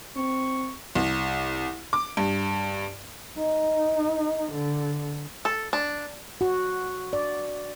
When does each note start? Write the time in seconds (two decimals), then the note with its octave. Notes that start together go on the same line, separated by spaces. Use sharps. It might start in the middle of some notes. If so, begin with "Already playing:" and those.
0.16 C4 C#6
0.95 C2
1.93 D6
2.17 G2
3.38 D#4
4.53 D3
5.45 A4
5.73 D4
6.41 F#4
7.13 D5